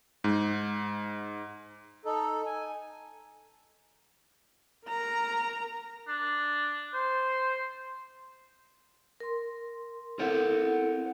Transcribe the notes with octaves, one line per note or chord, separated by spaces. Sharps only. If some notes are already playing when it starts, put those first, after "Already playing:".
G#2
D#4 A4
G#5
A#4 A#5
D4
C5
A#4 C6
C4 E4 A4 A#4 C5 F#5